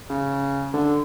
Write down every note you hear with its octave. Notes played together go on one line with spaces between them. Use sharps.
C#3
D3